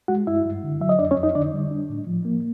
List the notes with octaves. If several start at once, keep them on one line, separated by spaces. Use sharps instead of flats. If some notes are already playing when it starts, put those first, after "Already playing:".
G#3 F#4 F#5
G2 E4 E5
G2
D3
F#3 E5
D#5
F2 D4 D5
C#4 C#5
F2
D#4 D#5
D3 D4 D5
G3
D4
A2
F3
A#3